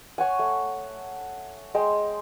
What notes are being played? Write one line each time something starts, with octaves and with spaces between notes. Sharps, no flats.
C#5 F#5 G#5
A3
G#3 G5 C6